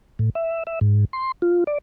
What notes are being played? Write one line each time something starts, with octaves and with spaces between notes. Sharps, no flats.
A2
E5
E5
G#2
C6
F4
D5